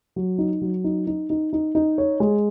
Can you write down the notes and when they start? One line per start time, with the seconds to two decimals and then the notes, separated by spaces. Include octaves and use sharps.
0.16 F#3
0.38 D#4
0.62 F#3
0.84 D#4
1.07 D#4
1.30 D#4
1.53 D#4
1.75 D#4
1.98 C#5
2.20 G#3